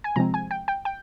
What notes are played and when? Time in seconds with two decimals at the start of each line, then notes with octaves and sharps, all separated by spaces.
0.04 G#5
0.16 C3 F3 G#3 C4 A#5
0.34 G#5
0.51 G5
0.68 G5
0.85 G5